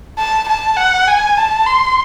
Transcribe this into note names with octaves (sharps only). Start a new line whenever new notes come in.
A5
A5
F#5
G#5
A5
C6